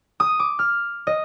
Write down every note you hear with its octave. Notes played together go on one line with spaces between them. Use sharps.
D#6
D6
F6
D#5